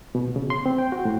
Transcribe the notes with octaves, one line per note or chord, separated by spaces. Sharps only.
B2
C#3
C6
C4
G5
F#4
A2